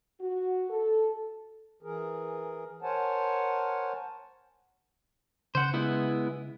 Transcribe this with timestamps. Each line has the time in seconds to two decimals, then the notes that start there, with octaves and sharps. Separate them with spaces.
0.21 F#4
0.70 A4
1.83 E3 G#4 A#4
2.82 A#4 C5 C#5 F#5 G#5 A5
5.55 C#3 C5 F#5
5.74 G#3 B3 E4